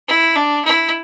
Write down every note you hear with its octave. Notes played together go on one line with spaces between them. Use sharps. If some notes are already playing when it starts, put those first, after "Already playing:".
E4
D4
E4